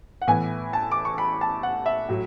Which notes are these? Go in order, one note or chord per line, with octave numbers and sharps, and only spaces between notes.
F#5
A2 E3 B3 G#5
A5
D6
C#6
B5
A5
F#5
E5
A2 F#3